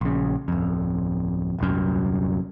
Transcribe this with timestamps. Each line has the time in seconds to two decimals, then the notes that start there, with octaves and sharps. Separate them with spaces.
0.01 A#1 C#3
0.48 D1 F2
1.59 D#1 C2 F#2